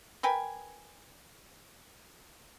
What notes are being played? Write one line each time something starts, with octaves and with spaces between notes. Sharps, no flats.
A#4 B4 G5 G#5